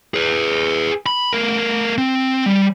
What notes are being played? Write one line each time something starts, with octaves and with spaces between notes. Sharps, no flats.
G#4 B4
B5
A3 A#4
C4
G3